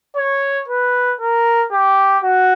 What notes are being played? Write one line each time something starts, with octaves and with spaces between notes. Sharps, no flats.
C#5
B4
A#4
G4
F#4